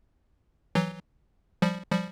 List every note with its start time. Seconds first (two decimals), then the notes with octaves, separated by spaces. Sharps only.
0.75 E3 F#3
1.62 F3 G3
1.91 F3 G3